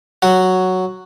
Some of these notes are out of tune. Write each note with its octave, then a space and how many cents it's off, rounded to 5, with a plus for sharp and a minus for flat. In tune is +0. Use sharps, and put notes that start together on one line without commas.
F#3 +0 F#4 +0